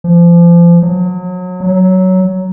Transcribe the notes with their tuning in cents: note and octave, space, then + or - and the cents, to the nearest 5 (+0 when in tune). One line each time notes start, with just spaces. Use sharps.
F3 -30
F#3 -30
F#3 +10